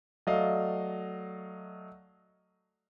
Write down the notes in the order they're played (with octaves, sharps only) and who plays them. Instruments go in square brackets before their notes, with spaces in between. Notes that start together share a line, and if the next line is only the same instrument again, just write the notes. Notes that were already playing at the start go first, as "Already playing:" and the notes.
[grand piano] F#3 A3 D5 D#5 F5